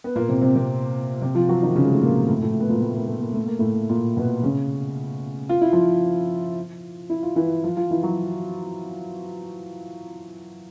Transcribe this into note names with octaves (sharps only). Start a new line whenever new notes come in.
B3
A#2 A#3
C3 C4
C3 C4
C3 C4
C3 C4
F3 F4
F#3 F#4
D#3 D#4
C#3 C#4
G#3
A3
A#2 A#3
A2 A3
A2 A3
B3
A#2 A#3
A3
A#3
A3
A#3
A3
A#3
A2 A3
A#2 A#3
B2 B3
C#3 C#4
F4
E4
F3 F4
E4
F4
E3 E4
F3 F4
F3 F4
E3 E4
F#3 F#4